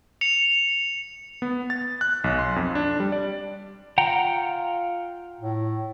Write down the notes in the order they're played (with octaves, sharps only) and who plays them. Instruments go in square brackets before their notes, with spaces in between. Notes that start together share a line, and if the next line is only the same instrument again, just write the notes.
[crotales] C#7 F7
[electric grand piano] B3
A6
F#6
B1
C6
F2
D4
G3
D5
[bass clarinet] F4 [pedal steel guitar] F#5 G5 A#5
[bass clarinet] A2